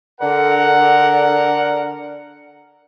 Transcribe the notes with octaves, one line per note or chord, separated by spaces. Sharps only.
D3 A#4 F#5